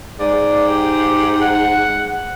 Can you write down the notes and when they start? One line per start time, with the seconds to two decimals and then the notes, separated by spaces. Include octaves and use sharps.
0.20 G#2 D5
0.69 G4
1.41 F#5